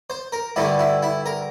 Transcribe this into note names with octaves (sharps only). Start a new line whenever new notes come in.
C5
A#4
G2 D3 A3 E4
E4
E4
A#4